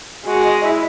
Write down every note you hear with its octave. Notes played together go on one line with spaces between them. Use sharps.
G#3 F#4
D#5
E4